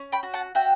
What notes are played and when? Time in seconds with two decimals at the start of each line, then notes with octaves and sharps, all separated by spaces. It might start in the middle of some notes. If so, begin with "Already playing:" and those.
Already playing: C#4
0.12 G5 B5
0.23 F#4
0.34 F#5 A5
0.55 F#4 E5 G5